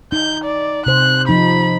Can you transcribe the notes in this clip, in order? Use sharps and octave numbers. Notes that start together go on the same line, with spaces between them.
D#4 G6
D5
C3 C5 F#6
F3 D#4 B5